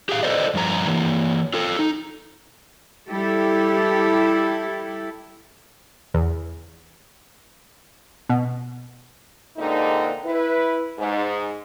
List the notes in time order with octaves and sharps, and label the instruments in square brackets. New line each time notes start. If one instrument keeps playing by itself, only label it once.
[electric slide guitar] G4 G#4 F5
A4 B4 C5 D5 D#5
G2 F3 A#5
E3 A#3
F4 A4
D#4
[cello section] G3 E4 G4 A4
[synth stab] E2
B2
[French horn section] A#2 D3 G#3 C4 D#4
E4 B4
G#2